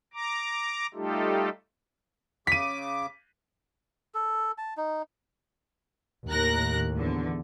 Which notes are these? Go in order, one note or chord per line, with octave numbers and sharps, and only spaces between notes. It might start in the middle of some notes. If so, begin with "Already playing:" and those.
A#5 D6
G3 A3 D#4 F4 G4 A4
C#3 D6 B6 D#7
A4
A5
D#4
D#2 A2 A#4 F#6 A#6
E2 D3